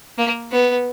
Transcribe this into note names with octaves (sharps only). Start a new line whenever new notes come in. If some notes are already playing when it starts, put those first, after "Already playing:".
A#3
B3